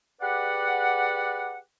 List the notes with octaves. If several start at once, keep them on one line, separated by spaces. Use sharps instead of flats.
G4 G#4 B4 D5 F#5